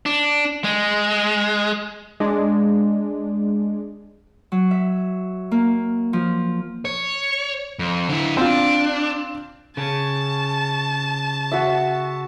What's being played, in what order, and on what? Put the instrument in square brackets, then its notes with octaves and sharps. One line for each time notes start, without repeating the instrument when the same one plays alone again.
[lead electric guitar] D4
G#3
[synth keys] G#3 D4
[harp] F#3
E5
A#3
F3
[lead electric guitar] C#5
F2
D3 E4
[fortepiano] C4 F4 [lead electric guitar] D4
[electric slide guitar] C#3 C#4 [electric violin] A5
[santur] F#4 E5